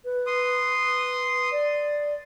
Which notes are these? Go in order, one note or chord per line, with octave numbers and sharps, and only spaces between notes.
B4
C6 D#6
D5